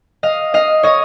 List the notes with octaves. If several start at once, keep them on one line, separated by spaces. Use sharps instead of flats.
D#5 F5
D#5 F5
C#5 D#5